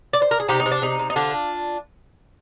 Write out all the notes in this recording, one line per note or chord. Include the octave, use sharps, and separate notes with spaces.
D5
C5
A#4
G#4
C3 D#4 G4
D#4
C3
D4
C3 D#4
C3
D#4
D3 D4 F4